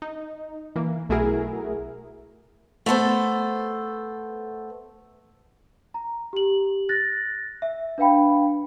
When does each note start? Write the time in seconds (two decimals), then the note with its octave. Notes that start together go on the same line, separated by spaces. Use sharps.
0.02 D#4
0.76 E3 A#3
1.09 B1 A3 E4 F#4 G#4 A#4
2.86 A3 B3 A4 C5
5.94 A#5
6.33 G4 F#7
6.89 F#6 A6 A#6
7.62 E5
7.98 D4 B4 F5 G5 B5